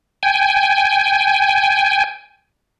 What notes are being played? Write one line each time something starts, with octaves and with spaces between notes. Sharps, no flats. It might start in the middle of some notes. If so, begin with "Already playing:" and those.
G5 G#5